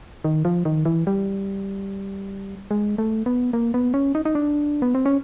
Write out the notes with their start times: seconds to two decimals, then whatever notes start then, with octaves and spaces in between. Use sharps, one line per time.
0.24 D#3
0.45 F3
0.65 D#3
0.85 E3
1.07 G3
2.71 G#3
2.98 A3
3.26 B3
3.53 A#3
3.74 B3
3.94 C#4
4.15 D#4
4.25 D#4
4.35 D4
4.82 B3
4.95 C4
5.06 C#4